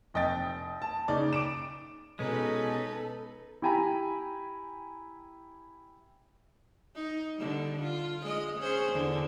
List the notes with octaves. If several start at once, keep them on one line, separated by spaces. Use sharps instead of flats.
F1 D#5 G5 A6
A5
C#3 D#4 D5 D6
D6 D7 E7
B2 G#3 C#4 D#4 A4 B4
E4 G4 G5 G#5 A#5 B5
D#4
D3 G3
F4
G#3 D#5
C#4 G#4 C5
E2 D3